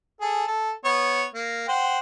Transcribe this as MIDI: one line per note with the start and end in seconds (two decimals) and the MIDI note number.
0.21 0.44 68
0.21 0.44 69
0.47 0.72 69
0.85 1.25 59
0.85 1.25 73
1.34 1.67 58
1.68 1.99 72
1.68 1.99 78
1.68 1.99 79